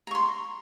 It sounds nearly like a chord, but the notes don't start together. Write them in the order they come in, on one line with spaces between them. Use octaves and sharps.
A#5 C#6 C6